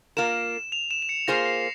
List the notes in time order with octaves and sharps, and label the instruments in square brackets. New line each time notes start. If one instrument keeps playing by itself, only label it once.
[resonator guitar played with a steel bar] A#3 F4 A#4 [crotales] E7
[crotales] F7
E7
E7
C#7
[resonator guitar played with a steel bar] A#3 F4 G#4 C5 [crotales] A#6
[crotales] C7